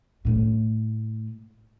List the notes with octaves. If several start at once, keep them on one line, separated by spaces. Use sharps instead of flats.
A2 A3